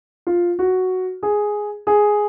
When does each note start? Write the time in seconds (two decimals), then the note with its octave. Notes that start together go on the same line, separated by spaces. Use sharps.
0.27 F4
0.59 F#4
1.23 G#4
1.87 G#4